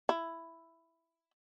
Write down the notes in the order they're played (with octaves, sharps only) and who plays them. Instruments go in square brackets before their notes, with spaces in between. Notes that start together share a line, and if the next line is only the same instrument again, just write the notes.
[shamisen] E4